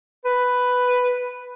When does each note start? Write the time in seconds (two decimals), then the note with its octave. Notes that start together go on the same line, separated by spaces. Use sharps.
0.25 B4